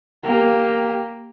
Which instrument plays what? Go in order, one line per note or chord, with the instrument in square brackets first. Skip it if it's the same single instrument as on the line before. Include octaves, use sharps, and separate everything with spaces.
[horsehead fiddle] A#3 G4